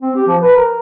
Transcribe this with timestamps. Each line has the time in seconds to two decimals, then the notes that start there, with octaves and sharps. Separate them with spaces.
0.02 C4
0.16 G4
0.28 F3
0.42 B4
0.57 A#4